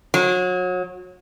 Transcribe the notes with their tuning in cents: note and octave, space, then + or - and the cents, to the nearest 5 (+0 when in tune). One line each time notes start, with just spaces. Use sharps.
F#3 -30